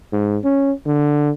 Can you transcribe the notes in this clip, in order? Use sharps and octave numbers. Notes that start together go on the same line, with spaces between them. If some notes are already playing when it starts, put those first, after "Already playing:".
G#2
C#4
D3